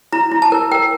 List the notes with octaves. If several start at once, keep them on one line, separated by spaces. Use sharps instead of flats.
E4 A#5
E4
A5
A#4
A#4 G5